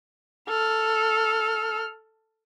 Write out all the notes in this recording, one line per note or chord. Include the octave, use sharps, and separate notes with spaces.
A4 F6